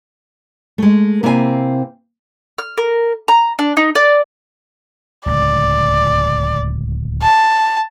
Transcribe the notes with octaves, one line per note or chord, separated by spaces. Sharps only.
G#3 A3
C3 A#3 C4 E4 C#5 G#5
F6
A#4
A#5
D4
D#4
D5
D1 C#2 D5
A5